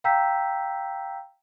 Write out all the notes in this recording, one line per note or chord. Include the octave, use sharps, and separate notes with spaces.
F5 G5 A#5 E6 G6 B6